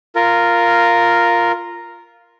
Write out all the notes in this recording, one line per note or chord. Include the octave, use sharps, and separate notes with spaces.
F4 A#4